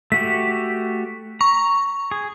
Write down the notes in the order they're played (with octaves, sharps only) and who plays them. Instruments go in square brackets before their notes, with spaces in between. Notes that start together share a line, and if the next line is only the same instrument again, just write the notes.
[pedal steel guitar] A3 F#4 G4 [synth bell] B6
[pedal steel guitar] A#5 [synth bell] C#6
[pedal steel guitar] G#4